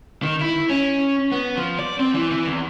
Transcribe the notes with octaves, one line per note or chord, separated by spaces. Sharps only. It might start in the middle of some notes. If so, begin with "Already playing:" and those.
D#3
E4
C#4
B3
F3
D5
C4
E3
E3
E2